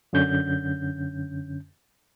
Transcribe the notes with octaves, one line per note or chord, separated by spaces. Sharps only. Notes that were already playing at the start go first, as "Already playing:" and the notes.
F#2 D3 C#4 G6